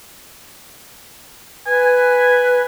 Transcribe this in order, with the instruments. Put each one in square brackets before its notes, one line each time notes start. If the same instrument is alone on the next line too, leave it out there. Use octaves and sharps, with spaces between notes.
[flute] B4 [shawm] G#5